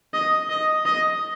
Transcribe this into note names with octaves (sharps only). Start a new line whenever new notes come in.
D#5
D#5
D#5